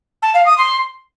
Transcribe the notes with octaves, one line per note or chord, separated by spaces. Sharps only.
A5
F5
D#6
C6